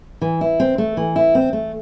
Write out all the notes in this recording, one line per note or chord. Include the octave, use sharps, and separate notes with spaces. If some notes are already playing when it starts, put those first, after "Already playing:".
E3
E4
C4
A3
E3
E4
C4
A3